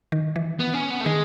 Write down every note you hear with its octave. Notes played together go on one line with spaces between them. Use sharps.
D#3
E3
B3
C#4
B3
A3
D#3 G#3